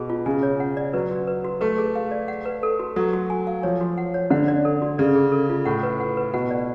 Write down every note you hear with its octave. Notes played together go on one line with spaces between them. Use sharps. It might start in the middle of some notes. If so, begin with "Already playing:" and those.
Already playing: B2 G#4
F4
C#3 G#5
C#5
F#5
D5
F#3 B4
F#4
B4
F#4
A3 B4
G#4
F5
D5
F#5
B4
A4
F#4
F#3 A4
F#4
G#5
F5
F3 C#5
F#4
F#5
C#5
D3 F#5
D5
A4
F#4
C#3 D5
G#4
A4
F4
A2 F#5
B4
F#5
B4
B2 F#5
D5